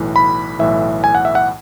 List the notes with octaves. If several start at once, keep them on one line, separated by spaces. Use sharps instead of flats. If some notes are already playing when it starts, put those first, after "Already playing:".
Already playing: B1 A2 E3
B5
B1 A2 E3 E5
G#5
F#5
E5
F#5